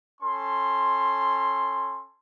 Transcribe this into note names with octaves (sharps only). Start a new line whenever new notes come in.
C#4 A4 C6